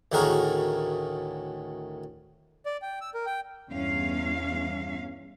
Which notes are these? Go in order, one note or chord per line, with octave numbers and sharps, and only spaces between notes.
D2 A2 D#3 F#4 G#4 A#4
D5
G5
E6
A#4
G5
E2 G2 C#4 F5